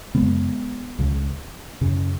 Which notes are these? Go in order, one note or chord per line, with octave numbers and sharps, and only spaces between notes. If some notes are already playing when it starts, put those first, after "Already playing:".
F#2 C#3 G#3 B3
C#2 C#3
F#2 C#3